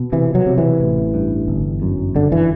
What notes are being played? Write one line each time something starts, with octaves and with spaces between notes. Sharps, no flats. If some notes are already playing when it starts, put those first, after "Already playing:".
Already playing: B2
C3 E3
F#3
C3
E3
A1
G2
G1
F#2
G1 D3
E3